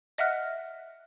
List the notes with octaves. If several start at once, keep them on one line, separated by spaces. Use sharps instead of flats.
D#5 E5 F#5 F6 F#6